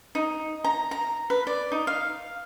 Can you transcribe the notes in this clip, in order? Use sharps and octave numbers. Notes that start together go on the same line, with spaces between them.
D#4
A#5
A#5
B4
D5
D#4
F5